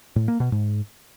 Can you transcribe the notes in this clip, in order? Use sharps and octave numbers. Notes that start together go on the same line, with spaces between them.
A2
A#3
B2
G#2